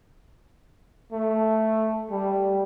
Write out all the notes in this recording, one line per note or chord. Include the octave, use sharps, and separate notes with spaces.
A3
G3